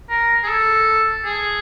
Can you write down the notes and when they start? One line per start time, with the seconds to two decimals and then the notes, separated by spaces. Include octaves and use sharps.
0.09 A#4
0.43 G#4
0.48 A4
1.25 G#4